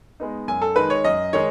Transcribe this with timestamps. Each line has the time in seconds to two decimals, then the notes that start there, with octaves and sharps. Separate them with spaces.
0.20 G#3 B3 D#4
0.48 F#2 G#5
0.62 A4
0.76 D#3 G#3 D#4 B4
0.90 C#5
1.04 F#2 D#5
1.33 D#3 G#3 D#4 C#5